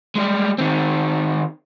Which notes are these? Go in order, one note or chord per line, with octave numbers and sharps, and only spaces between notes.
G3 G#3
D#3 C4